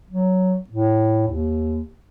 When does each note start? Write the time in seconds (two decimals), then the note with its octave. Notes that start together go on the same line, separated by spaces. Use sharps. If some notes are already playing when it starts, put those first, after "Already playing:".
0.11 F#3
0.69 A2
1.28 D#2